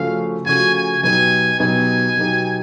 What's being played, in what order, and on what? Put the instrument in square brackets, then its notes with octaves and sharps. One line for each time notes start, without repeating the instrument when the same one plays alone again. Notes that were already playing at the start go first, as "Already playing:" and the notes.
Already playing: [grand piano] C#3 F3 A3 C#4 F#4 [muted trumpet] F5
[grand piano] C#3 F3 A3 C#4 F#4 [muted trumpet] G#5
[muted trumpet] G#5
[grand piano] B2 F#3 B3 D#4 G4 [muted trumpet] G#5
[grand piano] B2 F#3 B3 D#4 G4 [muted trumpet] G#5
[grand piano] B2 F#3 B3 D#4 G4